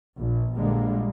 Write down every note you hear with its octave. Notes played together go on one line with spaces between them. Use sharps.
A#1
A#1 D3 G3 G#3 A#3